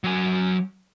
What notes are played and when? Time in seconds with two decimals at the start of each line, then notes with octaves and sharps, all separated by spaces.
0.04 F#3 G#5